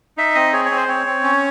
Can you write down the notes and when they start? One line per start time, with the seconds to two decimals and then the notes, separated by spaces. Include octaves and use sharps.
0.17 D#4 E5
0.35 C4 D#5
0.53 G#4 C#5
0.65 C#5
0.71 C4
0.77 C5
0.88 C4 C#5
1.06 C4
1.23 C#4